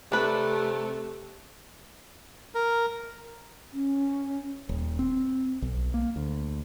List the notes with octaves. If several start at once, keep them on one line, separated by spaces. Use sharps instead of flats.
C3 A3 D4 B4
A#4
C#4
D#1
C4
B1
A#3
D2